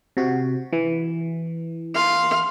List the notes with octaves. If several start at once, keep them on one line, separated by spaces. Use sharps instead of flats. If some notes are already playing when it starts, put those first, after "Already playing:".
C3 F#4
E3
F5 C6